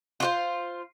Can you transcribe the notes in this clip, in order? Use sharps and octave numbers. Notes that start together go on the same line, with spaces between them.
F4 F#4 C5